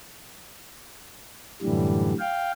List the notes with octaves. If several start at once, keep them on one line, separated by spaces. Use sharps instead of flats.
F#2 A2 D3 E3 G3
F5 G5